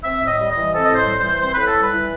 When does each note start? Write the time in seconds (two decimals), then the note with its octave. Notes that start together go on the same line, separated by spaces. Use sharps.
0.04 C4 E5
0.21 A2
0.27 D#5
0.38 G3
0.49 D#5
0.55 E3
0.72 C4 A4
0.84 D#5
0.90 A2 C5
1.06 G3
1.18 E3 C5
1.40 C4 C5
1.54 A2 B4
1.67 A4
1.75 G3
1.81 B4
1.92 E3